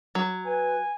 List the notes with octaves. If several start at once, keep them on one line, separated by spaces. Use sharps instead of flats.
F#3
B4 G#5